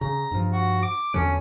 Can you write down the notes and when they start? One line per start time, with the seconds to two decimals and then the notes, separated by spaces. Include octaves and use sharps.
0.01 C#3 A#5
0.31 G2 F3
0.53 F#4
0.83 D6
1.14 E2 D3 F#3 C#4